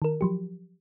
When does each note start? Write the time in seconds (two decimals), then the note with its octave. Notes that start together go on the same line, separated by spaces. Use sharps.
0.02 D#3 A#4
0.21 F3 F#3 G4